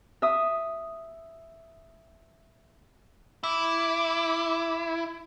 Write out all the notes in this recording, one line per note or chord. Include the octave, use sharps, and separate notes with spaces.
E5 D#6
E4 D6